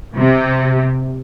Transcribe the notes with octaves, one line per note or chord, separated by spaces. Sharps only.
C3